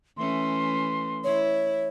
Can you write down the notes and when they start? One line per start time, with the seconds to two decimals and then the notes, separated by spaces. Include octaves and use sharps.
0.17 E3 A3 C#4 C6
1.24 E4 C#5